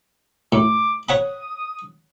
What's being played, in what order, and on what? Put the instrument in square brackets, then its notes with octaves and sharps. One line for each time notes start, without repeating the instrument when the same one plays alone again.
[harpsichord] A2 [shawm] D6
[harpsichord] C#5 F#5 B5 [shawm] D#6